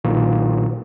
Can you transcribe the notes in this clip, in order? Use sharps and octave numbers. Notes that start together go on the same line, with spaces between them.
B1 A#2 D#3